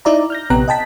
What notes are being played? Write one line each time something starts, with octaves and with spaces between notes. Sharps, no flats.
D#4 E4 D5 E5 A#5
F6 G6 A#6
A#1 C3 B3 G4 A#5 F#6
D#5 G5 A5 B6